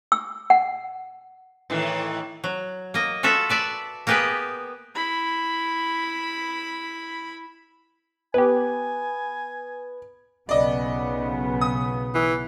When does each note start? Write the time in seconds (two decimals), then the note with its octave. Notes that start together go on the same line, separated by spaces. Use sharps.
0.12 E6
0.50 F#5
1.70 A2 D#3 E3
2.44 F#3
2.94 A#3 D#5
3.23 F4 F#4 A4 E5
3.49 B4 D5 E5
4.07 A#3 B3 G4 G#4 B4 G5
4.95 E4 B5
8.34 B3 G4 B4 G#5
10.49 B1 C#3 B3 D5 D#5
11.61 D#6
12.14 E3